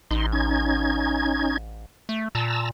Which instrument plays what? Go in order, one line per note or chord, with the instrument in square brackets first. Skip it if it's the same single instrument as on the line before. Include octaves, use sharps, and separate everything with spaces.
[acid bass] A1 [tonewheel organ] D#4 C6
[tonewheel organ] C#4 D#4 G#6
[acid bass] A3
[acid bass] A#2 [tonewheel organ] A5 A#5 E6